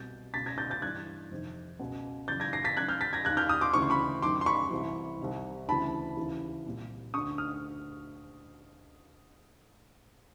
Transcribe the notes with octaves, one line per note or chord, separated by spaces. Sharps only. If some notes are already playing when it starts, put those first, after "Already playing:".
Already playing: C2 B2 G6 A6
C#2 B2 A6 B6
G#6 A#6
G6 A6
G6 A6
G2 E3 F#6 G#6
F2 C3 D#3
C#2 B2
F#2 C#3 E3 G6 A6
G#6 A#6
A#6 C7
A6 B6
F#2 D#3 F#6 G#6
F6 G6
A6 B6
G#6 A#6
D#2 D#3 F#6 G#6
F6 G6
D#6 F6
C6 D6
D2 C#3 E3 C#6
C6
B5 C#6
F#2 D#3 C6 D6
C6
B5 C#6
C2 C3 E3
C2 C3 D#3
D2 C#3 E3 A5 B5
D#2 C#3 E3
C2 A#2
D2 D3 C#6 D#6
D#6 F6